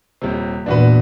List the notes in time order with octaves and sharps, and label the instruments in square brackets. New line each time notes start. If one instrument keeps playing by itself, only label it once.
[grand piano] D#1 C3
[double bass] E2 A#2 [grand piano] D4 F#4 B4